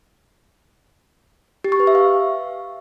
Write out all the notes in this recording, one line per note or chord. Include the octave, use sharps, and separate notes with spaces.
G4
C#6
B4
E5
F5